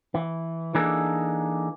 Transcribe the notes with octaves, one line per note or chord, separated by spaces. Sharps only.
E3
E3 A#3 D4 D#4 G#4 A4